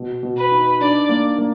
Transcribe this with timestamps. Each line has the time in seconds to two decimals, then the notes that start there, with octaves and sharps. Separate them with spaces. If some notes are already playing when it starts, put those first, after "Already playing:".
Already playing: B2
0.23 B2
0.37 B4
0.52 D#4
0.81 D4 D5
1.09 A#3
1.38 A#3